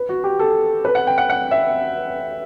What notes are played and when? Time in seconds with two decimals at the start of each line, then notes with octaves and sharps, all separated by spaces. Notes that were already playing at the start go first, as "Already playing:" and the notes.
Already playing: B4
0.09 F#4
0.24 G4
0.39 A4
0.85 B4
0.95 F#5
1.07 G5
1.18 F#5
1.30 F#5
1.51 E5